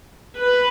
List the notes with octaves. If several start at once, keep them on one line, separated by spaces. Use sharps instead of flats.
B4